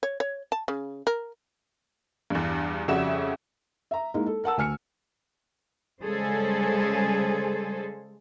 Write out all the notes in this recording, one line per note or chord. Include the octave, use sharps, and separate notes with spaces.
C#5
C#5
A5
C#3
A#4
E2 G2
F2 C#3 G3 F#4 E5 E7
E5 A#5
G#3 A#3 D#4 E4 A#4
A4
A#4 F#5 A5 E6
D2 G#5 F6 C#7
C#3 G3 G#3 G#4 A4 C5